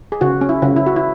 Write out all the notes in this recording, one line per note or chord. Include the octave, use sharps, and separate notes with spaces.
G#4
C#3 F#4
C#4
E4
C#3
E4
F#4
E4